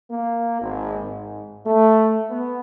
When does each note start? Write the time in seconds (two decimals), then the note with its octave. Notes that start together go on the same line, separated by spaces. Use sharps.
0.11 A#3
0.62 G#1
1.02 G#2
1.66 A3
2.30 B3